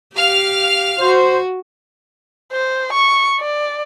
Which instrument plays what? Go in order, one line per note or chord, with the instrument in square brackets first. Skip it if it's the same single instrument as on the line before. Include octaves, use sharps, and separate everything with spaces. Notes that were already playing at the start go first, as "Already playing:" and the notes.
[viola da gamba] G4 [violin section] F5 F6
[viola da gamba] F#4 [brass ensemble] C5
[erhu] C5
C#6
D5